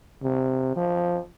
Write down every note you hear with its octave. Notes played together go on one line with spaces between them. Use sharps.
C3
F3